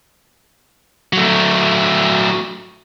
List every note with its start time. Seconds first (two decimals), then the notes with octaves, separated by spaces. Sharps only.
1.13 F#3 A3